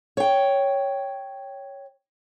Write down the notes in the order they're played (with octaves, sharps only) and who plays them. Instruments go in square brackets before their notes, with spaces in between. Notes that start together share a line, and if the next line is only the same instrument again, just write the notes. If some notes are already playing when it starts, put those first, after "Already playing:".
[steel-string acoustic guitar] C#5 G5